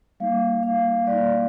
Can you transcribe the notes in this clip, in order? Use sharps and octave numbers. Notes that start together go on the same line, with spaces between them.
G3 A#3 D#4 F5
F5
G3 A#3 D#4 D5